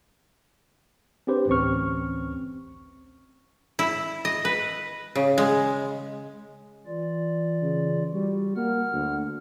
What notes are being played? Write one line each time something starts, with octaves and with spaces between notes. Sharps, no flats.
C4 D4 G4 B4 C5
A1 D2 C4 C#4 C#6 F6
E4
D#5
B4
C#3
G#3
E3 F4 D5
C#3
G3 F#4
A#3 F#5 F6
D2